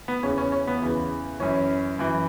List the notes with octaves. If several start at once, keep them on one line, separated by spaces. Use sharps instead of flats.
B3
E2 C#3 E3 C#4
C#4
C#4
B3
E2 C#3 E3
F#2 E3 C#4
F#2 E3